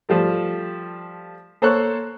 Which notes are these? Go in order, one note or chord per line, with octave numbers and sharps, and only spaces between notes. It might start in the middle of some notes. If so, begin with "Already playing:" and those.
F3 G3 A3
A#3 A4 C5 C#5 C#6 F#6